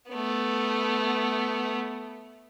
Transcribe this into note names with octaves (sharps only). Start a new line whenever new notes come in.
A3 B3